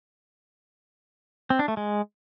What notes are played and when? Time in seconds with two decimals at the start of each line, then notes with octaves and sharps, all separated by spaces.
1.50 C4
1.59 D4
1.68 A3
1.77 G#3